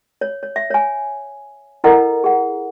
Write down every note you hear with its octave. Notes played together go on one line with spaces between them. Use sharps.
C#5
C#5
E5
C#5 G#5
E4 A4 A#4 D#5 F#5 A#5
G#4 F#5